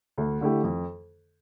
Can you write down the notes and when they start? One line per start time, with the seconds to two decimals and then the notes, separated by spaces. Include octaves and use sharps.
0.18 D2
0.41 D3 A3 E4 G4
0.64 F2